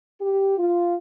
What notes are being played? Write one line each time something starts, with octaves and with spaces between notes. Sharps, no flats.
G4
F4